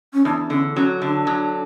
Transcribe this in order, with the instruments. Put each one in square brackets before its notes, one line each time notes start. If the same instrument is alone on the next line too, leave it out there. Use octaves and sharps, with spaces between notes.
[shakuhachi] C#4
[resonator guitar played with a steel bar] E2 [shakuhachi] D4
[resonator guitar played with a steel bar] D3 [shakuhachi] C#4
[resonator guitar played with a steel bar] F#3 [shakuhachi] C#4
[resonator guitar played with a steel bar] D3 [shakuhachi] D4
[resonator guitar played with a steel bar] F#3